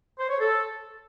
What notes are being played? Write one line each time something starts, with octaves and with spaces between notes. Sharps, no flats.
C5
C#5
A4